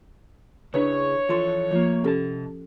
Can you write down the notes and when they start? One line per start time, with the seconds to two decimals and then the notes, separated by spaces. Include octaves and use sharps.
0.74 C#3 D4 E4 G#4 B4 C#5
1.29 E3 F3 F4 A4 C6
1.71 F3 A3 A#3 F4
2.04 C3 C#4 G4 A4 A#4 A5